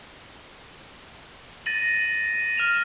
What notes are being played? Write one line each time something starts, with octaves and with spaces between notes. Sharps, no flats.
A6 A#6 D#7 F#7
D#7
F6 E7 F7